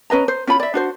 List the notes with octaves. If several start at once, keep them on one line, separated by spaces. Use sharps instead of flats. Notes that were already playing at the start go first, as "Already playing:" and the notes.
C#4 B4 D#5 A#5
C5
C#4 F4 B5
D5 E5
D4 F#4 C5